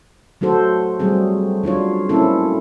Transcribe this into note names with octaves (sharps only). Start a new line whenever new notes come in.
F#3 A3 F#4 A4 C5
F#3 G3 A3 C4 G#4
F#3 D4 F4 C#5
A3 A#3 C4 C#4 E4 A4